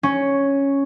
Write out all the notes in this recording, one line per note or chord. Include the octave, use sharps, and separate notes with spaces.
C#4